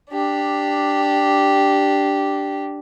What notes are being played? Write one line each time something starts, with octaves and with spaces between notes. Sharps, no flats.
D4 G4